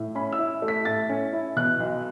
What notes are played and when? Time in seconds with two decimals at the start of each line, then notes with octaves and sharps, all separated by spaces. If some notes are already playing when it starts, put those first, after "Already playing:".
Already playing: A2
0.15 C#4 B5
0.32 E6
0.39 E4
0.62 A3
0.68 B6
0.85 A2 A6
1.09 C#4
1.33 E4
1.56 B2 F#6
1.80 B1